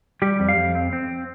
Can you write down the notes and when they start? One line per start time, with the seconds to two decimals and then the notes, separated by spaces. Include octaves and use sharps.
0.22 G3 G4
0.40 F2
0.49 F5
0.57 F2
0.75 C4
0.93 C4